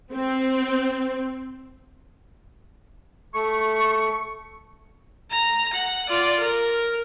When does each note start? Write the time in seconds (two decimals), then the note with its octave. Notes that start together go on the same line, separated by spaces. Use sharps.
0.14 C4
3.34 A3 C#6
5.31 A#5
5.74 F#5
6.09 F4 D5
6.40 A#4